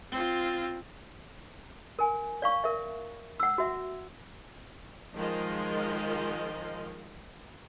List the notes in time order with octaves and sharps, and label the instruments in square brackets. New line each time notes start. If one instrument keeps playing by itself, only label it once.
[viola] C4 F4
[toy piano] A#4 G#5
D5 F5 C#6
A#4 E5
F#5 E6
F#4 E5
[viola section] D#3 F3 G#3 F4 A#4 D#5